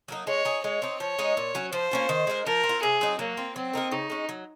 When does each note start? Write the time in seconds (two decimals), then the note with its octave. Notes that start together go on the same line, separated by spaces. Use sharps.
0.08 F#3 A#3 D#4
0.27 G#3 C#5
0.45 D#4 G#4
0.64 G#3 C#5
0.82 C4 D#4
1.00 F3 C#5
1.18 G#3 D#4
1.37 A#2
1.55 F#3 C#4
1.72 F3 C5
1.91 A#3 C#4 F4
2.09 D#3
2.27 G#3 D#4 A#4
2.46 F3 A#4
2.63 C4
2.69 F4
2.82 C3 G#4
3.01 F#3 C4 D#4
3.19 F#3 A#3
3.37 C4 F4
3.56 F#3 C4
3.73 A#3 D#4 A#4
3.91 C#3 D#4
4.10 G#3 C#4
4.29 F#3